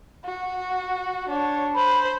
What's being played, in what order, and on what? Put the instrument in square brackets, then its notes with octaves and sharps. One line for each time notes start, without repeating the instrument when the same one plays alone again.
[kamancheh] F#4
D4 C#5
[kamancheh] C5 [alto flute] B5